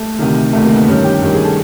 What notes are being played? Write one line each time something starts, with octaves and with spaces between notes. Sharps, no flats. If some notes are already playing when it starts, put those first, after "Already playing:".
Already playing: A3
D2 C3 D#3
D2 C3 D#3 A3
A#3
B3
G2 D#3 C#4
G4
G2 D#3
G#4
A4